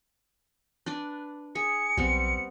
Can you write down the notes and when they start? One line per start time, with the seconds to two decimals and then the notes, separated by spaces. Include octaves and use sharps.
0.86 D4 B4 D5
1.55 G#4 E5 C#7
1.97 B1 G3 B3 C4